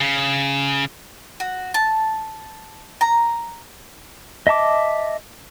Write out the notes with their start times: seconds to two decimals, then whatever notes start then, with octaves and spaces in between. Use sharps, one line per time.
0.01 C#3
1.40 F#4
1.74 A5
3.01 A#5
4.47 D#5 E5 A5 D6